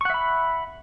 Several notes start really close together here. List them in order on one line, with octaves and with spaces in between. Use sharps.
C#6 F#5 E5 B5